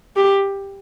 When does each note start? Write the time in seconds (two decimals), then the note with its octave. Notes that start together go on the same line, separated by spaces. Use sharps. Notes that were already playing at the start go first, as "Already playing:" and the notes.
0.17 G4